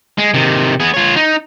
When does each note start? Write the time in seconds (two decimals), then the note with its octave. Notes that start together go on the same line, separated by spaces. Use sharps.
0.18 G#3
0.34 C3 D#3
0.80 B3 G#4
0.94 F4 C#5
1.16 D#4